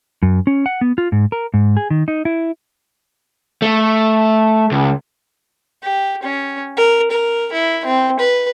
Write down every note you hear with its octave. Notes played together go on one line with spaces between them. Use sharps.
F#2
C#4
F#5
B3
F4
G#2
A#4
G#2
G#4
D#3
D#4
E4
A3
C#2
G4
C#4
A#4
A#4
E4
C4
B4